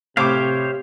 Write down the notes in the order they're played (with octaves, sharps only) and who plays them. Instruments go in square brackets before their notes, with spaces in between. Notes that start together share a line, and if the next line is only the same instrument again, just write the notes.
[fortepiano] A2 D6 [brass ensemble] C3 [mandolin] G4 [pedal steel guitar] C5 C#5 F5